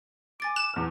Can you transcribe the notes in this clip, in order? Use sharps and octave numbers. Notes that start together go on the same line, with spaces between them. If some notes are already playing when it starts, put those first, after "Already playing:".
G#5 D6 A6 D7
F#6 E7
E2 F6